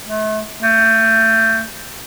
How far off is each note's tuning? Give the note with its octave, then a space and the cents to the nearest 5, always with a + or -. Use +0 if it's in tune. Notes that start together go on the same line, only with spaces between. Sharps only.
A3 -35
A3 +30